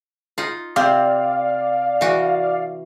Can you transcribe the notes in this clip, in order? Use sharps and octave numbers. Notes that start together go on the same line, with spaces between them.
D#4 F4
C3 C4 D5 F5
E3 F#4